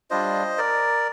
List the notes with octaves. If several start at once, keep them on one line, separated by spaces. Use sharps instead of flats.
G3 D4 F4 C5 D#5
A#4 D5